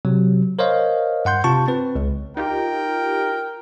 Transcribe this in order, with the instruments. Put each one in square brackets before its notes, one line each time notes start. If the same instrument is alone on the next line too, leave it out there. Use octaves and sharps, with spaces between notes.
[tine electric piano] C3 F#3
A#4 C5 C#5 D#5 F5
G2 F#5 C6 G6
C3 F4 A5 C#6
C4 B4
C#2
[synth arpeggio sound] D#4 F4 G4 [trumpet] A#4 [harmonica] G5